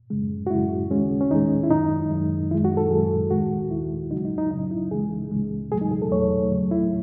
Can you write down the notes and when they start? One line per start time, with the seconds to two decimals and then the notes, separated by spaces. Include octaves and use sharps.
0.10 F#2 C#3 G#3
0.47 F#4
0.51 F#2 C#3 G#3 E4
0.90 D#2 D#3 G#3 C#4
1.21 C#4
1.31 D#2 D#3 G#3 D#4
1.63 E4
1.71 F#2 D#3 G#3 D#4
2.11 F#2 D#3 G#3
2.51 F#2 D#3 G#3 E4
2.65 F#4
2.77 A4
2.91 F#2 D#3 G#3 G#4
3.30 D#2 D#3 G#3 F#4
3.71 D#2 D#3 G#3 E4
4.11 C#2 C#3 F#3 D#4
4.25 D#4
4.38 D#4
4.51 C#2 C#3 F#3 D#4
4.71 E4
4.91 C#2 C#3 E3 G#3 G#4
5.31 C#2 C#3 E3 G#3
5.71 E2 B2 F#3 A3 G#4
5.81 D#4
5.91 G#4
6.02 A4
6.11 E2 B2 F#3 A3 C#5
6.51 D#2 C#3 F#3 A3
6.71 E4